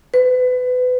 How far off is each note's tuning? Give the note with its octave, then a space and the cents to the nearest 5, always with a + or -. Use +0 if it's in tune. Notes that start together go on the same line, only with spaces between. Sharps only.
B4 +25